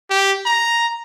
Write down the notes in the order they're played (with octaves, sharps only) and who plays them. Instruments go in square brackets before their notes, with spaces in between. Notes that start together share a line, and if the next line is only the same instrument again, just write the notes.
[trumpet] G4
A#5